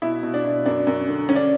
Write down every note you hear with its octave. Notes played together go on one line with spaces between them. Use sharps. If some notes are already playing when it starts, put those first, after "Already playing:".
B2 E4
B2
D4
B2
F#2 D4
F#2
D3
D3 C#4
D4